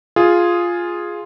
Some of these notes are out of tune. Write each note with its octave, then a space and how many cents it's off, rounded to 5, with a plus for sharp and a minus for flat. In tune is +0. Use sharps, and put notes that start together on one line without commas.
F4 +0 G#4 +0